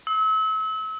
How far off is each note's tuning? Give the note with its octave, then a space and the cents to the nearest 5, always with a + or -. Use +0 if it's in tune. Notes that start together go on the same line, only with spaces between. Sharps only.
E6 -35